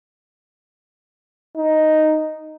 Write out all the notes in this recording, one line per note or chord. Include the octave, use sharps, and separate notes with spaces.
D#4